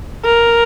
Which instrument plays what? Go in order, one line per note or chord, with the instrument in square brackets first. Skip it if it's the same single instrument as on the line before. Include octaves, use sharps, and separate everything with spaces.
[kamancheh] A#4